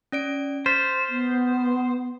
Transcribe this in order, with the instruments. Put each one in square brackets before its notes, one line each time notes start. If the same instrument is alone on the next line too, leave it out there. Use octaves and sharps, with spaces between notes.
[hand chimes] C#4 D5 D7
[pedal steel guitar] C5 [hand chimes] F6 A6 B6
[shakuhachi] B3